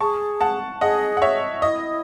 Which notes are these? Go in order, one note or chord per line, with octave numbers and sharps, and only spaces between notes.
G#4 A5 C#6
F#5 A5
G#4 D#5 F#5
F#5
C#5 E5
E4 D#5